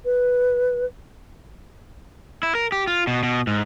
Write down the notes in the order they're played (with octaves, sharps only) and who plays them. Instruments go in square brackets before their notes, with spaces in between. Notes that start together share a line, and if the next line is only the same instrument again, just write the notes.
[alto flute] B4
[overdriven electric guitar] E4
A#4
G4
F4
B2
B2
G#2